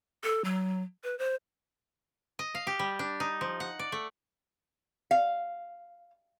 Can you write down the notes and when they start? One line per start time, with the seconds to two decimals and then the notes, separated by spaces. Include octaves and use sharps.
0.24 A4
0.44 F#3
1.04 B4
1.19 C5
2.39 D#5
2.55 F5
2.67 G4
2.79 G3
2.99 D4
3.20 D#4
3.41 F3
3.60 F#5
3.79 D5
3.92 A3
5.11 F5